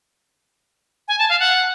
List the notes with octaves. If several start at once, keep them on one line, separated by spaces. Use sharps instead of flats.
G#5
A5
F5
F#5